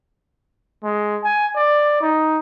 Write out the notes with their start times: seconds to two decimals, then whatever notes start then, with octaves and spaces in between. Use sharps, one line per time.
0.83 G#3
1.23 G#5
1.56 D5
2.01 D#4